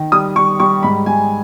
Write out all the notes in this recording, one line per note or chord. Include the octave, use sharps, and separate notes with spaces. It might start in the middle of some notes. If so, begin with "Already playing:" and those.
Already playing: D#3
G3 D#6
G3 C#6
G3 C#6
G#2 B5
G3 G#5